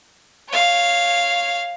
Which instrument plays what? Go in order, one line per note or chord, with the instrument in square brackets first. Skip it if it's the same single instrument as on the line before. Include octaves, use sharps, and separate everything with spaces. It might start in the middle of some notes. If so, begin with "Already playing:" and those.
[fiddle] C#5 F5